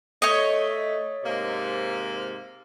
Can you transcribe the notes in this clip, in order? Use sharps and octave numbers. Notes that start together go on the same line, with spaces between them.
A3 C#5 D#5
G#2 C3 A#3